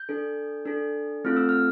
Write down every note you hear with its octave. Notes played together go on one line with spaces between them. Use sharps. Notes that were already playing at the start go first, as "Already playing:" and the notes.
Already playing: G6
D4 A4
D4 A4
A3 C4 F4 A4 F6
E6
F6